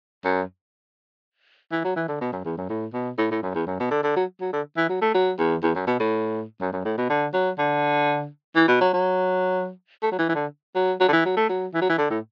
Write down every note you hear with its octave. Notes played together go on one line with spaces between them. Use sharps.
F#2
E3
F#3
E3
D3
B2
F#2
E2
F#2
A2
B2
A2
A2
F#2
E2
F#2
B2
D3
D3
F#3
F#3
D3
E3
F#3
A3
F#3
E2
E2
F#2
B2
A2
F#2
F#2
A2
B2
D3
F#3
D3
E3
B2
F#3
F#3
A3
F#3
E3
E3
D3
F#3
F#3
D3
E3
F#3
A3
F#3
E3
F#3
E3
D3
A2